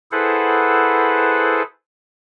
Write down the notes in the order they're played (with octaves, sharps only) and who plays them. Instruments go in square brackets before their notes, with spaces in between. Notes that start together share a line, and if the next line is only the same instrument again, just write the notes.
[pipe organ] E4 G#4 A4 B4 C5 F#5